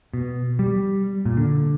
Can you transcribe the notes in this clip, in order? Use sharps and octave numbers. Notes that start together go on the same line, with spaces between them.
B2
G3
A#2
D3